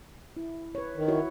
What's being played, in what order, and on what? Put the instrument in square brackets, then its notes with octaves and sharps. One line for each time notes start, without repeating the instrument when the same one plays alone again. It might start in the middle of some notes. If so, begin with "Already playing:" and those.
[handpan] E4
B4 C#5
[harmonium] D#3
[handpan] E4 F#4 C#5